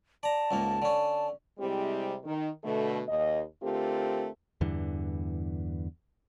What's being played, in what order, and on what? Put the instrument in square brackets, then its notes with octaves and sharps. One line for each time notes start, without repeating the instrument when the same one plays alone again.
[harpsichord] D5 A#5 [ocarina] A5
[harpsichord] C#2 G#2 A#3
D3 C#4
[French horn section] C3 G3 G#3 C4 E4 G4
D#3
B2 D3 A3
D#2 D#5
D3 A3 C4 F4 G4 A#4
[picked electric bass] E2 G2 D3 E3